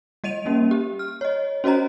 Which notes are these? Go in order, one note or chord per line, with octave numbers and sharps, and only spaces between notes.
G3 D#5 D#7 F7
G3 A#3 C#4
G4
F6
C#5 D#5
C#4 F#4 C5 D#5 A#5